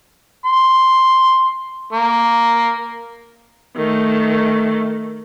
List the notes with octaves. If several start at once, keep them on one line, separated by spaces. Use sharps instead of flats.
C6
A#3
D#3 A3